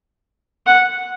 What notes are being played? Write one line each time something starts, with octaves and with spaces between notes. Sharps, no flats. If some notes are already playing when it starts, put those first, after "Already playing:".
F#5